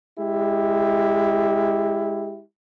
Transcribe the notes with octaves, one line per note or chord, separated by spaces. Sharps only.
G#3 E4 G4